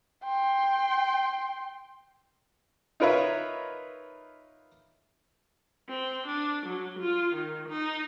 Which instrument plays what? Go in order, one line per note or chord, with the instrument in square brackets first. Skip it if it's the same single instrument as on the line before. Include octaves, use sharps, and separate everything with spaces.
[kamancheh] G5 C6
[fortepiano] D#4 F4 A#4 B4 C#5 E5
[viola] C4
D4
F#3
F4
D#3
D#4